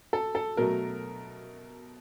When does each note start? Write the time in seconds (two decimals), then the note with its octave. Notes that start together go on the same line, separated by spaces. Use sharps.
0.13 A4
0.35 A4
0.57 B2 F#3 A3 A#4